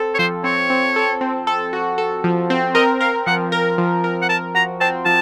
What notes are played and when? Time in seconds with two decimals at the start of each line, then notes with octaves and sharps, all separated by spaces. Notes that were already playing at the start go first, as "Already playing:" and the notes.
Already playing: C4 A4
0.15 C#5
0.18 F3 C5
0.44 C4 C#5
0.70 C4
0.96 A4
1.21 C4
1.47 A4
1.73 F#4
1.98 A4
2.24 F3
2.50 C4
2.75 A#4 D#5
3.01 A#4 F5
3.27 F3 F#5
3.52 A#4
3.78 F3
4.04 A#4
4.22 F#5
4.29 A#4 A5
4.55 F#4 A#5
4.81 C4 A5
5.06 F3 A5